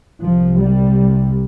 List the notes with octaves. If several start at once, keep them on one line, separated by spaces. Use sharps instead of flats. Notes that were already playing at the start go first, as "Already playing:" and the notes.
C2 C3 F3
G3